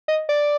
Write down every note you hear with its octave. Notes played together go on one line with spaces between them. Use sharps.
D#5
D5